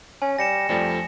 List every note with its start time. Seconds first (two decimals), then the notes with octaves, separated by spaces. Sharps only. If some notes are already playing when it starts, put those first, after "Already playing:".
0.22 C#4 G#5
0.38 G3 A#6 C#7 E7
0.69 F2 F3 G3 A3